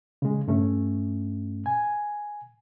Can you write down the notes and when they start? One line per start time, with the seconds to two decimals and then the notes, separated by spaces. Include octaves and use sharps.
0.22 C#3 G#3
0.48 G2 A3 C#4
1.66 G#5